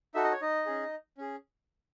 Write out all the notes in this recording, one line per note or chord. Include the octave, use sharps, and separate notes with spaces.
D#4 F#4 A4 E5
D#5
C#5
D#4 D#5
C#4 G#4
C#4 G#4